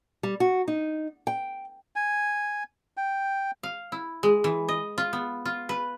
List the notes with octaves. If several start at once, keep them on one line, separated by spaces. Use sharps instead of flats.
G3
F#4
D#4
G5
G#5
G5
F5
E4
G#3
E3
D#5
F4
B3
F4
B4